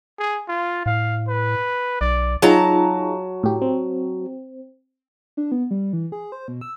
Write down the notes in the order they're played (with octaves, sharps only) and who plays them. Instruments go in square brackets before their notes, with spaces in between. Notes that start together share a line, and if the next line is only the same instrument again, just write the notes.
[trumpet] G#4
F4
[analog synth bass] A2 [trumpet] F5
[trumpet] B4
[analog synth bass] B1 [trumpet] D5
[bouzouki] F#3 A5 A#5 [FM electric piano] D#4 F4 G#4
[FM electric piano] A2 G4
C4
[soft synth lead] D4
B3
G3
E3
G#4
C5
B2
E6